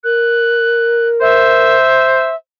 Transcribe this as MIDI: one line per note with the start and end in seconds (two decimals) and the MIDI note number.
0.04 1.76 70
0.04 1.08 90
1.21 2.29 72
1.21 2.35 76